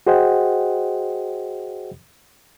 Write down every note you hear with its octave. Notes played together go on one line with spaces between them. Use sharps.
F#4 G#4 C5 D#5 F#5 G5